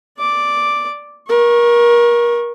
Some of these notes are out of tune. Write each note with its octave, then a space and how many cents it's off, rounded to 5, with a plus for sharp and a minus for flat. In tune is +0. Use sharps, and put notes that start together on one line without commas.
D5 +0 D6 +0
A#4 +30 C#6 -20